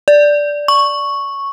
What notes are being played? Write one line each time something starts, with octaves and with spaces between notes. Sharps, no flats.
D5
C#6